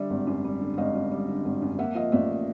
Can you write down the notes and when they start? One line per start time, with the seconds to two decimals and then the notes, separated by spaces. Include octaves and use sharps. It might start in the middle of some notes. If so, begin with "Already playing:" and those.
Already playing: D3 G3 D5 E5
0.10 G#1
0.27 F#2
0.44 G3
0.61 D3
0.78 G#1 D#5 F5
0.95 F#2
1.11 G3
1.29 D3
1.45 G#1
1.62 F#2
1.79 A#3 E5 F#5
1.95 F3 D#5 F5
2.12 A1 D5 E5